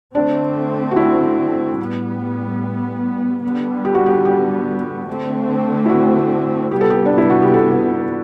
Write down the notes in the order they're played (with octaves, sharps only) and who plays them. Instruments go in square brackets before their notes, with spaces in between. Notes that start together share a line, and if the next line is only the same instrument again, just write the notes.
[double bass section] D3 A3 C4 [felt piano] D4
[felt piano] F#4
E4
[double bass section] A2 G3 B3
D3 G3 B3
[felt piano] G4
F#4
G4
G4
[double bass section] D3 A3 C4
[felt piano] E4
F#4
[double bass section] C3 G3 B3 [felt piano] G4
[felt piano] A4
G4
D4
E4
F#4
G4
A4